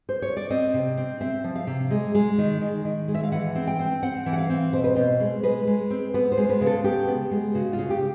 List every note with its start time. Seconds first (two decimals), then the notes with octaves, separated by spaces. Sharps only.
0.09 C5
0.22 C#5
0.37 D5
0.50 C4 D#5
0.74 C3
0.97 C4
1.21 C4 E5
1.44 F3
1.56 F5
1.67 C3
1.91 G#3
2.15 G#3
2.38 D#3
2.61 D#3
2.85 D#3
3.08 G#3
3.14 E5
3.23 F5
3.32 E3 F#5
3.55 C4
3.67 G5
3.79 C4
4.03 C4 F#5
4.26 E3
4.33 F#5
4.38 F5
4.50 C4
4.73 B2 C5
4.84 B4
4.95 B2 C5
5.20 G#3
5.43 G#3 B4
5.67 G#3
5.90 C4
6.14 B3 B4
6.32 C5
6.37 G#3
6.49 B4
6.61 C#3
6.67 A4
6.84 B3 G4
7.08 B3
7.31 G#3
7.55 C#3 F#4
7.73 F4
7.79 C#3
7.90 G4